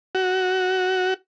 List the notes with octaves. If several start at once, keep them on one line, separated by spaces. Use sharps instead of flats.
F#4